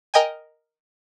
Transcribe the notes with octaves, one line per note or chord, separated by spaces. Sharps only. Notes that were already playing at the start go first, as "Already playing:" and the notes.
A#4 D#5 G5 G#5